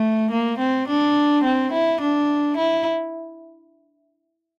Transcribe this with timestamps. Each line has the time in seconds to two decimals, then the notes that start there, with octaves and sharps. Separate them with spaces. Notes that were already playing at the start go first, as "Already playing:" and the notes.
Already playing: A3
0.31 A#3
0.58 C4
0.87 D4
1.43 C4
1.72 E4
2.01 D4
2.57 E4